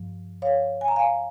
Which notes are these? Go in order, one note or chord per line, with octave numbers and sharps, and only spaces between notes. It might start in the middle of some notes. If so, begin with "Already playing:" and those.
Already playing: G2 F3
C#5 F5
G#5
A#5
F5 G#5